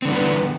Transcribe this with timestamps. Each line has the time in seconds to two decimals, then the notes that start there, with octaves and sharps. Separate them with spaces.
0.02 C4
0.05 D3
0.08 G3
0.10 E3
0.13 B3